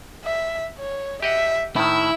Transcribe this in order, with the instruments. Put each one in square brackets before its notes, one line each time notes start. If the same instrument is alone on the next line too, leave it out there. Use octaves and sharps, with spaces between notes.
[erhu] E5
C#5
[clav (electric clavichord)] G4 D#5 F#5 [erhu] E5
[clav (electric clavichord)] A2 D#3 [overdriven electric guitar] E4 [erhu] E6